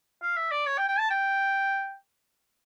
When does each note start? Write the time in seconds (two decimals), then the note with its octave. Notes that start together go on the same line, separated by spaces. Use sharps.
0.22 F5
0.36 E5
0.51 D5
0.66 C#5
0.78 G5
0.88 G5
0.99 A5
1.10 G5